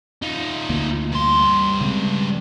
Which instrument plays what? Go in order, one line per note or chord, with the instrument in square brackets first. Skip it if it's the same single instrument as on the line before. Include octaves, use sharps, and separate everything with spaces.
[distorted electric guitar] D#4 F4
[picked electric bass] D2 D3 A#3
[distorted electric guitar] G2 C6
[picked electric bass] C#3 G#3 C4